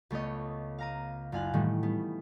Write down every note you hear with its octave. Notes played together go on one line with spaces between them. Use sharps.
C#2 A3 B3 C#5 D#5
F5 A#5 D#7
F#1 F4 F5 G#5 F#6
A2 D#3 E3 G3 A3
G3 B3